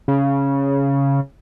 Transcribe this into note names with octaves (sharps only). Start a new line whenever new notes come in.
C#3